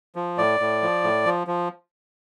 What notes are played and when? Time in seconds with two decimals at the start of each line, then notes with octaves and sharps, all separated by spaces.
0.16 F3
0.38 A2 D5
0.60 A2
0.82 F3
1.04 A2
1.26 F3
1.47 F3